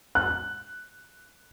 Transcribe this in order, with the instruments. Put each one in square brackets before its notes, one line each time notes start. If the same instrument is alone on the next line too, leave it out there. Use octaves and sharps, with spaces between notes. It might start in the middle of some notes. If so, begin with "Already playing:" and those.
[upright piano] F#6